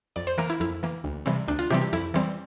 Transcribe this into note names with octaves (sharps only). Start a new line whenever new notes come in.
F2 D5
C5
E3 A#3 A#4
E4
F2 E4
E3 A#3
D2
C3 E3 G3 C4
D2 D4
F4
C3 E3 G3 C4 G4
G4
F2 E4
E3 G3 C4